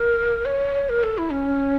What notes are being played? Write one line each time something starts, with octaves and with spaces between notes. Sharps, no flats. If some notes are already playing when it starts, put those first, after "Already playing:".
Already playing: A#4
C#5
A#4
A4
E4
C#4